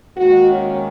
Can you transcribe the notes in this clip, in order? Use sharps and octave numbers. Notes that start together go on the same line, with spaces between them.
D#2 D#3 G#3 F#4
C#4